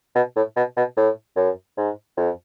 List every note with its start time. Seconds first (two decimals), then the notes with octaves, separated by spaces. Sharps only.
0.15 B2
0.36 A2
0.56 B2
0.77 B2
0.97 A2
1.37 F#2
1.77 G#2
2.17 F2